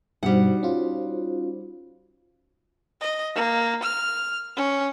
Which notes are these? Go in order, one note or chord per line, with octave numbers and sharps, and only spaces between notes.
G2 B2 G3 D#4 F#4 C5 F#5
C#4 F4
D#5
A#3
F6
C#4